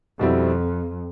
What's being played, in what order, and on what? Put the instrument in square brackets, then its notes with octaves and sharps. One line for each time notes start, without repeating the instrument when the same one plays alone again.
[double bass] F2 [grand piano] B2 G3 C4 E4